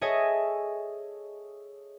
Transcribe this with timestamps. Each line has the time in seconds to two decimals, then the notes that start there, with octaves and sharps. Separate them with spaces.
0.01 G#4 A4 C#5 D#5 E5 G#5